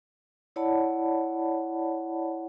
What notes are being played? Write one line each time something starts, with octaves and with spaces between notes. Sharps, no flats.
E4 C#5 D5 F#5 A5 B5